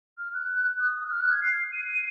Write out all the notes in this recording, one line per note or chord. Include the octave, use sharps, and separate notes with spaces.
F6
F#6
D#6
D#6
F#6
F6
F#6
G#6
C7
D#7
D#7